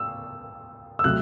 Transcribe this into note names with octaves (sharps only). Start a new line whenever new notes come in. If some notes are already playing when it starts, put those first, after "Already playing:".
Already playing: E6
E6
C3 F#3 A3 F#6